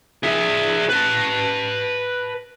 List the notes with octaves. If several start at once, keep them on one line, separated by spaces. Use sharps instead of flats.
G#4 E5
B4 A5